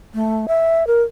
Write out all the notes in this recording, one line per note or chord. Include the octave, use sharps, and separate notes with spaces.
A3
E5
A#4